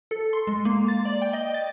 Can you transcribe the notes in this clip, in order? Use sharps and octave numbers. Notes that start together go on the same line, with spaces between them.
A4
C6
G#3
A#3
A6
D5
G5
D#5
A6